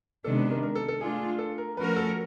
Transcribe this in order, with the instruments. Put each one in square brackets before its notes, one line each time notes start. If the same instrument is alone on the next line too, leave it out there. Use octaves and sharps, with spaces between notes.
[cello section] C3 D#3 G#3 B3 D4 [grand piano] A4
[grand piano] B4
A#4
A#4
A4
A4
[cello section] A3 D4 F4 [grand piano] G#4
[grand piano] A4
A#4
[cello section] F3 A3 C#4 F#4 A#4 [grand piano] B4
[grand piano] A4